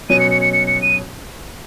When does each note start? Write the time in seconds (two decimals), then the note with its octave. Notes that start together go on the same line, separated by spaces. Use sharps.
0.10 B2 F#3 C#4 D#7
0.20 C#7
0.31 C#7
0.42 C#7
0.53 C#7
0.67 C#7
0.82 D#7